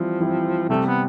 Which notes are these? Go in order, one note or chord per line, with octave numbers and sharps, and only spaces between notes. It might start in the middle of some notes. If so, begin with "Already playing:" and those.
Already playing: E3 F3 G3 C4 E4
E3 G3 C4 E4
C3 G3 A3 C4
B3